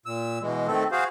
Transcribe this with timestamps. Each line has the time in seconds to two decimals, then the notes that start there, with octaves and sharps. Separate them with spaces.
0.06 A#2 E6
0.42 B2 E3 G#3
0.68 D#3 A3 C4 A4
0.92 F#4 G#4 C5 F5